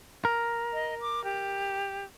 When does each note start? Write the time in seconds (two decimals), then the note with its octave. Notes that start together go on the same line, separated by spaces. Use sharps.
0.25 A#4
0.73 D#5
1.01 D6
1.24 G4